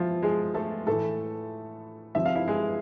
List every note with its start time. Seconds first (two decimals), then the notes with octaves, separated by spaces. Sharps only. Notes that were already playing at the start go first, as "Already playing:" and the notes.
Already playing: B2 F3 E4 F4
0.22 G#3 G#4
0.54 A3 A4
0.87 A2 E3 A3 A4
2.15 C3 F3 E5
2.25 F5
2.35 E4 E5
2.48 G#3 G#4